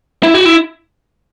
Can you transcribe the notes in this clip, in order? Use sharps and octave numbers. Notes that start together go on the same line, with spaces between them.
E4
F#4
E4